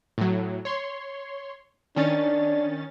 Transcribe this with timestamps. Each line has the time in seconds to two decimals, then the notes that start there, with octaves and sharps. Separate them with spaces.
0.18 A2 F#3
0.65 C#5 C6
1.96 D#3 C#4 D4 A6